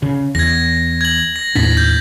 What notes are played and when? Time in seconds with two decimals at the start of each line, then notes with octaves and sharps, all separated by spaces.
0.02 C#3
0.35 E2 G#6 A#6
1.01 G#6 F#7
1.36 A#6
1.55 D#2 A2 D4 A6 B6
1.77 G6